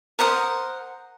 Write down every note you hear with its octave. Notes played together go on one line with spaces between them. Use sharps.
A#4 C5 F#5 D#6